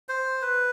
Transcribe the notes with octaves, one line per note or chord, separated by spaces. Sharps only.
C5
B4